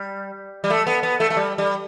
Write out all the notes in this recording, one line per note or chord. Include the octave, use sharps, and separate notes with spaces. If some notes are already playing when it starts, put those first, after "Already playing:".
Already playing: G3
G3
A3
B3
B3
A3
A3
G3
G3